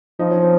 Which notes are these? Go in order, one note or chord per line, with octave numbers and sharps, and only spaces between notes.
F3 D#4
C#4
C4